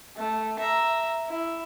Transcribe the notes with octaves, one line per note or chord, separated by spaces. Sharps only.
A3
E5 A#5
E4